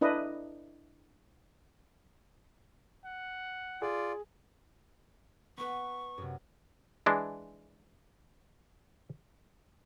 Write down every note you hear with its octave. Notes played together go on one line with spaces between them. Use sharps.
D4 E4 B4 D#5
F#5
F4 G#4 D5
B3 B4 C#6
F#2 C3
E3 G#3 D4